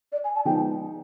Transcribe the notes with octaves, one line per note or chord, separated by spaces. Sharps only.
D5
G#5
A5
F3 G#3 B3 D#4 G5